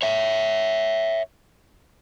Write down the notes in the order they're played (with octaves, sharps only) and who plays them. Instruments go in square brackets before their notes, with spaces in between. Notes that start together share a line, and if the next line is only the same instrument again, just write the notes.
[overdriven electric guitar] C#5 E5